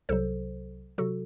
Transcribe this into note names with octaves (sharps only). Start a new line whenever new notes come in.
C2 C3 F#3 A4 C5
C3 F#3 F#4 A4